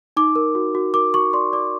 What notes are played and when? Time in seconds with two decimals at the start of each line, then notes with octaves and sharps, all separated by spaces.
0.17 D#4 D6
0.36 A#4
0.55 F#4
0.75 F#4
0.94 A#4 D6
1.14 F#4 C#6
1.33 D5 C6
1.53 D5 D6